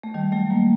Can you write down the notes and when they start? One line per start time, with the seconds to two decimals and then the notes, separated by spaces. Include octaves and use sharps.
0.03 A3
0.14 D#3 G3
0.32 F#3 A3
0.50 G3 A#3